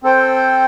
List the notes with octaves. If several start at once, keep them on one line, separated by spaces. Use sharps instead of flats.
C4 A4 C5 G5